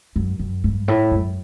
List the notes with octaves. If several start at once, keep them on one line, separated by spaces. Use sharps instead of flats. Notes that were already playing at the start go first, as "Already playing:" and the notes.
F#2
F#2
G2
A2
F#2